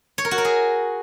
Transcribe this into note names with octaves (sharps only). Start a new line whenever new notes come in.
C#5
A#4
F#4
A#4
G#4